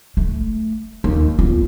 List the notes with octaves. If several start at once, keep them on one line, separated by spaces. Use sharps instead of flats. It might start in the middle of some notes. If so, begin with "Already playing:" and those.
A3
D#2
E2 F4